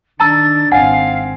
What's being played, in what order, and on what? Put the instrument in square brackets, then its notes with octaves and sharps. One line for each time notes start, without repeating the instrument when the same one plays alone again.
[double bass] D#3 D4 [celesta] A5 A#5 E6 [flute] A6
[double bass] G#1 C4 [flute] F5 [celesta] F#5 [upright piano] G#5